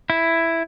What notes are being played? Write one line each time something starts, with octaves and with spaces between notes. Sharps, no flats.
E4